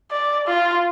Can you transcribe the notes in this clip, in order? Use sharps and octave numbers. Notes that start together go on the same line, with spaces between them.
D5
F4